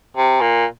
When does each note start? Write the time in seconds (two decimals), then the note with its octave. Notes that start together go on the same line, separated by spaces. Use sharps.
0.17 C3
0.41 A#2